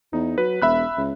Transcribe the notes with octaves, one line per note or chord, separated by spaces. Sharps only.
E2 D#4
F#3 B4
E1 E5 B5 F#6
C#2